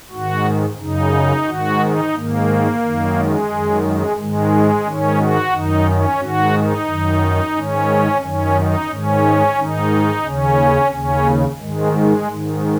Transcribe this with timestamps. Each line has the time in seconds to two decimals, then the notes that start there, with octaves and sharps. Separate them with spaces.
0.11 G#2 D#3 F#4
0.79 F#2 C#3 D#4
1.46 G#2 D#3 F#4
1.80 D#4
2.14 G#2 D#3 A#3
2.81 F#2 D#3
3.15 G#3
3.49 F#2 D#3
3.82 G#3
4.17 G#2 D#3 G#3
4.84 G#2 D#3 C#4
5.18 F#4
5.51 F#2 D#3 D#4
5.85 C#4
6.19 G#2 D#3 F#4
6.53 D#4
6.86 F#2 D#3
7.54 G#2 D#3 C#4
8.21 F#2 D#3 C#4
8.56 D#4
8.89 G#2 D#3 C#4
9.56 G#2 D#3 D#4
10.24 D#2 C#3 C#4
10.91 D#2 C#3 C#4
11.59 G#2 D#3 G#3
11.92 G#3
12.26 G#2 D#3